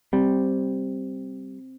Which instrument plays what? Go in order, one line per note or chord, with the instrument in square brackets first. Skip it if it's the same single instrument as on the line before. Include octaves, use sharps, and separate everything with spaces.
[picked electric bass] G3 [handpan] C4